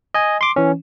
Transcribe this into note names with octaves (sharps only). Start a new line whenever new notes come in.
D#5 G#5
C6 D6
E3 C#4